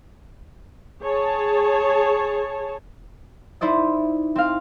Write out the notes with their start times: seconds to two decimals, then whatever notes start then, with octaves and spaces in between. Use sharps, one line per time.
1.01 G#4 C#5 A5
3.61 D#4 E4 C5 D5 D#5
4.36 C4 F5